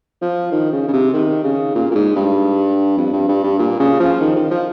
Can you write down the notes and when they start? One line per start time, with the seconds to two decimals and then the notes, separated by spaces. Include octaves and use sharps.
0.22 F3
0.52 D#3
0.73 C#3
0.88 C#3
0.93 C3
1.13 D#3
1.44 C#3
1.75 A#2
1.91 A#2
1.95 G#2
2.16 G2
2.98 F2
3.13 G2
3.28 G2
3.44 G2
3.59 A#2
3.79 C#3
4.00 F3
4.20 D#3
4.36 D#3
4.51 F3